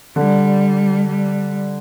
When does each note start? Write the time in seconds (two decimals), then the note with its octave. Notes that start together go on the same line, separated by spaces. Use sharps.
0.16 D3 G3
1.08 G3